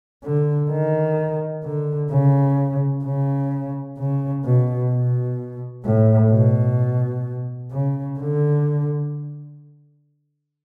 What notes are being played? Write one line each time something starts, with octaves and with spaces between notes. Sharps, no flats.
D3
D#3
D3
C#3
C#3
C#3
B2
B2
A2
B2
C#3
D3